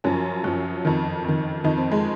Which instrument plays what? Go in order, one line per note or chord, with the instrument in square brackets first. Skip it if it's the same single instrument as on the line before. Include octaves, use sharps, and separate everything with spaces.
[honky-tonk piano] F#2 F3 C#4
F#2 F3
F2 D#3
F2 D#3
F2 D#3 D#4
C4
G#3